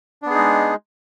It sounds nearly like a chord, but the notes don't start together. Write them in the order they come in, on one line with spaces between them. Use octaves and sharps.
D4 B3 G#4 D#4 G#3